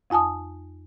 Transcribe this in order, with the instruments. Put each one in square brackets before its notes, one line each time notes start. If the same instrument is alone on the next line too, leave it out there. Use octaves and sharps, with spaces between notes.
[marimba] F2 F4 G#5 A5 D#6